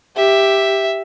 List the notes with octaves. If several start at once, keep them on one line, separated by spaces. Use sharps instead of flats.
G4 E5